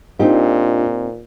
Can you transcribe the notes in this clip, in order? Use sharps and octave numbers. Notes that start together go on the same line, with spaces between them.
A#2 C4 D4 D#4 F4 G4 D#5